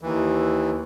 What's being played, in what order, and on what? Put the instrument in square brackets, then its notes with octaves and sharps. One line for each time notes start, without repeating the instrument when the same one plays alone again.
[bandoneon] D#2 E3